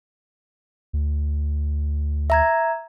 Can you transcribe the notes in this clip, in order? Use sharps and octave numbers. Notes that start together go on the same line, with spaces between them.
D2
E5 A#5 G#6